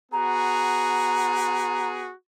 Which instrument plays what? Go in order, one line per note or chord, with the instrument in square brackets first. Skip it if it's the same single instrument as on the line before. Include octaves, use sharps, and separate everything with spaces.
[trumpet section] B3 F#4 G#4 [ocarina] A#5